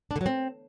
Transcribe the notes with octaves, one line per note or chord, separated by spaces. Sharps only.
D4
D3
F#3
C4